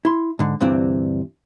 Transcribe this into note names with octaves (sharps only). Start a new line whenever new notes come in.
E4 C6
G#2 D3
D2 G2 C3 E3 C4 D4